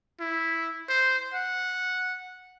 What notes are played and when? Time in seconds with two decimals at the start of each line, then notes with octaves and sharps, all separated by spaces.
0.20 E4
0.89 C5
1.34 F#5